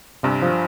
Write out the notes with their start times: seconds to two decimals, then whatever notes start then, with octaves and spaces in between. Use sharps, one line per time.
0.23 G1 G2 C3
0.42 F3